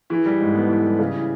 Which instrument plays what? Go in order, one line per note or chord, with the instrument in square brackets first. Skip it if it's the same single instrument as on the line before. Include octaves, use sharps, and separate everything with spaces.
[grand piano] E3 [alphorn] G#4
[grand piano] G3
G#2
[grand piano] B3 [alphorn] A4
[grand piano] E3
G3
[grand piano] C#3 [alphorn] G#4
[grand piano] E3